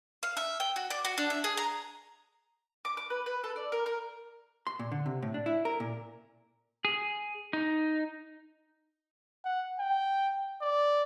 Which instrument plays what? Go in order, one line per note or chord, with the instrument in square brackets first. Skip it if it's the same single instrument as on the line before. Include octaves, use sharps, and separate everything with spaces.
[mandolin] F5
E5
G5
F#4
D5
F#4
D4
E5
G#4
A#5
D6
D6
B4
B4
A4
D5
A#4
A#4
[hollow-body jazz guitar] C6
A#2
D3
C3
A2
D4
E4
A#4
A#2
[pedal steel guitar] G#4
D#4
[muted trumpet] F#5
G5
D5